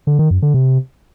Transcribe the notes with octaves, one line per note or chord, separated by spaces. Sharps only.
D3
D#3
F#2
D3
C3